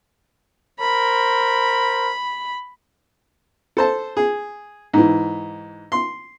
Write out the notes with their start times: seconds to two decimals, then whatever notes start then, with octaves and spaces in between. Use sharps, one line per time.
0.80 A#4 C5 B5
3.77 A4 C5 A5
4.17 G#4
4.94 G#2 E3
5.92 C6